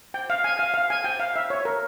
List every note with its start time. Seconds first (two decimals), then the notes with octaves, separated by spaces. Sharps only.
0.14 G5
0.30 F5
0.44 G#5
0.59 F5
0.74 F5
0.90 G#5
1.04 G5
1.20 F5
1.36 E5
1.50 C#5
1.65 A#4